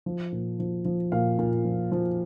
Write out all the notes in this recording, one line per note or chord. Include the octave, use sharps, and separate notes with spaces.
F3
A#2
F3
F3
A#2 F5
A#2
F3
F3